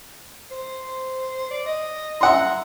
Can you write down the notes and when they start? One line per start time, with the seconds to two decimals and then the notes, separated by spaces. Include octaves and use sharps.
0.51 C5
1.51 D5
1.66 D#5
2.21 E5 F#5 A#5 C6